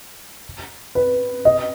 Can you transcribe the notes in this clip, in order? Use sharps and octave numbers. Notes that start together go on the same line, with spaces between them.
B4
D#5